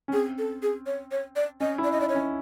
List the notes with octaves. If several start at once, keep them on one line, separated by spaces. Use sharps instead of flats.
C#4
C4 G#4
A4
G#4
C#5
C#5
D5
C#4 D#5
E4
D5
D#5
D#4 D5
C#5
C#4